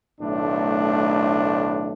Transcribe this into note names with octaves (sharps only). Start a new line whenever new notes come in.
B1 A2 D#3 A3 D4